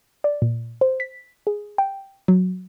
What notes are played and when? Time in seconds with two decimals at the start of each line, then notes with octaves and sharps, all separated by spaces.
0.24 D5
0.42 A#2
0.81 C5
1.00 B6
1.47 G#4
1.78 G5
2.28 F#3